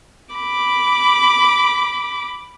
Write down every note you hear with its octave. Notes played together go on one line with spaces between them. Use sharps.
B5 D6